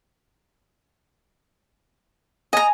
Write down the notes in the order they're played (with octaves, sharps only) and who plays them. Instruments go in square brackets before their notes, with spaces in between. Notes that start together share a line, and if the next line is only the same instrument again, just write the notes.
[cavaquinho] D#5 A#5 [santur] G#5